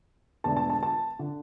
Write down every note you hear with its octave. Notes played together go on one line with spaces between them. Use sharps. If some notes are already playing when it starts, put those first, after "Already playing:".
E1 E2 D3 A3 D4 A5
A5
A5
A5
D3